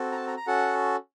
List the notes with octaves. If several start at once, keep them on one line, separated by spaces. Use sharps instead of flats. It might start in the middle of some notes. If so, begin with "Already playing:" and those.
Already playing: C4 F#4 A4
A#5
A5
A#5
A#5
C#4 F#4 A4 F#5